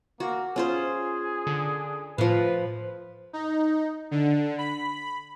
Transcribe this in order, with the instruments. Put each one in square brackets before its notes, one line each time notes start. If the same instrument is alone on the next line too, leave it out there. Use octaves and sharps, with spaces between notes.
[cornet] A#3 [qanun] F#4
[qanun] C#4 F4 C5 [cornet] G#4
[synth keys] D3
[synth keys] A2 F#6 [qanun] F3 F5 [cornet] B4
[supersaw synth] D#4
D3
B5